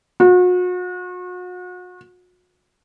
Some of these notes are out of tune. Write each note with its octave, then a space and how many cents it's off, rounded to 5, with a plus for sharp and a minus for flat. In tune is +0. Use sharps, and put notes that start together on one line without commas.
F#4 -40